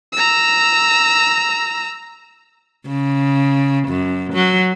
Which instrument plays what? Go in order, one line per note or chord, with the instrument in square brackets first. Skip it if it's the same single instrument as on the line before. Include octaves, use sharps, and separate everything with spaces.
[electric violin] A#5 E6
[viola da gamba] C#3
F#2
F#3